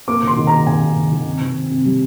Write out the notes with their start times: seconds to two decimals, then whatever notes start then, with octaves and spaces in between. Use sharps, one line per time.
0.08 A#3 D6
0.22 D#3
0.27 C6
0.37 D#3
0.47 A#3 A#5
0.67 D#3 G#5
0.82 D#3
0.96 D#3
1.11 D#3
1.26 C3
1.41 D#3
1.56 C4
1.70 C3
1.85 G3